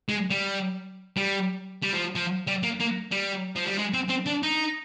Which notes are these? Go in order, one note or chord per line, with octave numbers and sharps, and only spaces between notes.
G#3
G3
G3
G3
F3
F3
G3
A#3
A#3
G3
F3
G3
G#3
C4
C4
D4
D#4